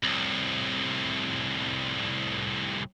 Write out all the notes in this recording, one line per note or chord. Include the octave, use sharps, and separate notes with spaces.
C2 A2